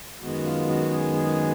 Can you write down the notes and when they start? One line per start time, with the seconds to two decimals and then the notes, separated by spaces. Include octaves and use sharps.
0.21 F#2 D#3 G#3 B3 F#4
0.44 F4
0.68 F#4
0.90 G#4
1.13 G#4